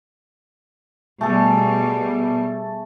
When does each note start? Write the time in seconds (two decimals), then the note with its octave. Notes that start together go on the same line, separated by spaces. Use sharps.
1.21 B2 G3 A3 G#4 A4